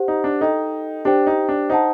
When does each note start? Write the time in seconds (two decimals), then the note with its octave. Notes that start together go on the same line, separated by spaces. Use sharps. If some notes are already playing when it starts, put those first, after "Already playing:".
Already playing: G4 C5 F#5
0.08 D#4
0.24 D4
0.41 D#4 A4 D#5 G5
1.05 D4 G4 C5 G5
1.27 D#4
1.49 D4
1.70 D#4 C5 F#5 A5